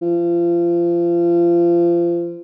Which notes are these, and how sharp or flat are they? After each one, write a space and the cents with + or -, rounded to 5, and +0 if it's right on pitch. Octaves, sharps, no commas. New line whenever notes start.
F3 -30